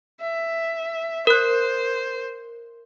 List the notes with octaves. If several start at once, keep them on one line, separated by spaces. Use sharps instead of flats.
E5
A#4 C5 F#6